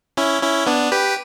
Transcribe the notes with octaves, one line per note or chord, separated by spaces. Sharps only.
C#4 E4
C#4 E4
B3 D4
G4 B4